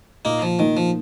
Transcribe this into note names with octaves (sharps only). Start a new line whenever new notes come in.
A#2 A#3 D#4
F3
D#3 A#3 D#4
F3